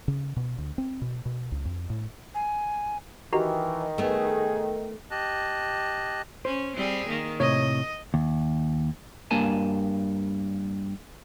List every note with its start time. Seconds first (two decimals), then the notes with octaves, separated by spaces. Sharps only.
0.08 C#3
0.36 B2
0.58 D2
0.78 C4
1.02 B2
1.26 B2
1.52 C#2
1.65 F2
1.90 A2
2.35 G#5
3.33 D#3 E3 F#4 G4 A#5
3.98 A3 B3 G#4
5.11 G4 D#5 A5 F#6
6.45 C#4 C5
6.76 G3 C4 G#4
7.08 D#3 A#3
7.40 A2 C3 C#5 D#5
8.14 D#2
9.31 G2 A#3 G#5 A5